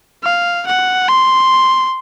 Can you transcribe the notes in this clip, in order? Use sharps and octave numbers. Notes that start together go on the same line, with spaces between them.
F5
F#5
C6